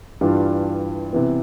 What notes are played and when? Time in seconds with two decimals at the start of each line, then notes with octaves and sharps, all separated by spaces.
0.21 G2 E3 G3 D4 F4
1.13 C3 E3 B3